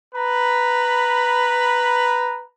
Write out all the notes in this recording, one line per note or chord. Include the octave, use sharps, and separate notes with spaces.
B4 A#5 B5